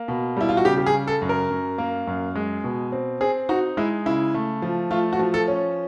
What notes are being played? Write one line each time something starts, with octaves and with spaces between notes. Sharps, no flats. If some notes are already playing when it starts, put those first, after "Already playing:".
Already playing: A#3
B2
G3 E4
F4
F#4
C#3 G4
G4
G#4
C#3
A4
F#2
A#4
F#2
A#3
F#2
G#3
B2
C4
C4 G#4
D#4 F#4
G#3 E4
C#3 E4
A3
F3
A3 F4
F#4
F3
A4
C#4